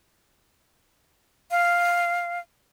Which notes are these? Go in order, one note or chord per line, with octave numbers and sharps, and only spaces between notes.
F5